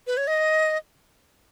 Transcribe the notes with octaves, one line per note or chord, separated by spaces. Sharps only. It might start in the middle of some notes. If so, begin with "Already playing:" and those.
B4
C#5
D#5